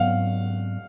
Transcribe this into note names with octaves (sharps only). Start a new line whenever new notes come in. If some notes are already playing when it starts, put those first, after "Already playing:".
Already playing: G#2 F#3 B3 F5 F#5